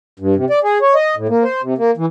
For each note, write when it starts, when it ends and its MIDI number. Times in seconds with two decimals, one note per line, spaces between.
0.20 0.35 43
0.36 0.45 48
0.50 0.59 74
0.64 0.78 68
0.82 0.94 73
0.95 1.15 75
1.16 1.27 45
1.29 1.43 58
1.44 1.61 72
1.62 1.74 48
1.78 1.91 58
1.97 2.06 52